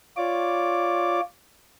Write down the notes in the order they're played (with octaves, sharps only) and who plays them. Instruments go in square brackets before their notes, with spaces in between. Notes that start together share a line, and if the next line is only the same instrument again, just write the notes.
[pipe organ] F4 C#5 D5 D6